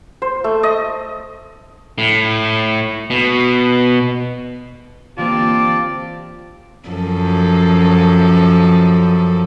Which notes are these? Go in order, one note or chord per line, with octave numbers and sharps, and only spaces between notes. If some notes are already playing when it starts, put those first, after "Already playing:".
C5
A3
D#5
A2
B2
D3 E3 A#3 C4 F4 G4 D5 A5
F#2 F3 A4